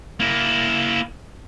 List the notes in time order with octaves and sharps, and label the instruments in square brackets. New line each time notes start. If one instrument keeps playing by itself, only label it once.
[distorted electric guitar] A#3 E4